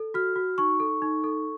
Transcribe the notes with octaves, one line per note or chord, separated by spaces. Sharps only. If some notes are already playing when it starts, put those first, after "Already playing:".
Already playing: A4
F#4 F6
F#4
D#4 C#6
A4
D#4
A4